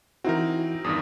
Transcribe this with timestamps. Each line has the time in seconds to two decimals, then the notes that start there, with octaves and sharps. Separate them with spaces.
0.24 E3 C4 D#4 E4 F#4 A#4
0.84 E2 G2 D#3 D#6